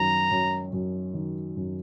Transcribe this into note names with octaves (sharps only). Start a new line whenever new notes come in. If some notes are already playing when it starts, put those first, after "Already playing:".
Already playing: F#2 D#3 A#5
F#2
F#2
D#3
F#2